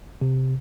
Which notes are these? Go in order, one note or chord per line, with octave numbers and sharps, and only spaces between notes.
C3